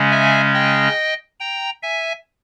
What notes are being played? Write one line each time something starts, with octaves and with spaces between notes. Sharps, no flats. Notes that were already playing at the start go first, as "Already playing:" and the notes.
Already playing: C#3 G#3 C#4
E5 G#5
D#5 G5
G5 A#5
E5 G#5